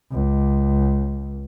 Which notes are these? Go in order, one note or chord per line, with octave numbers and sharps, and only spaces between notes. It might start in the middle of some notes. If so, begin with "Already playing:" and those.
C#2